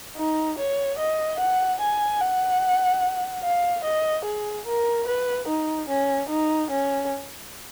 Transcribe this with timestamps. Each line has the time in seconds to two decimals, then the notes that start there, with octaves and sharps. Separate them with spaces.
0.16 D#4
0.59 C#5
0.99 D#5
1.40 F#5
1.81 G#5
2.21 F#5
3.44 F5
3.84 D#5
4.25 G#4
4.66 A#4
5.07 B4
5.48 D#4
5.89 C#4
6.30 D#4
6.71 C#4